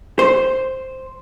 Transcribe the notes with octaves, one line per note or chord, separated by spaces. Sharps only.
C5